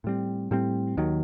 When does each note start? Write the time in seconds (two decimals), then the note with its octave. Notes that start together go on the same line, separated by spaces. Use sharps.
0.04 A2 G3 C4
0.51 A2 G3 C4
0.97 D#2 D#3 F#3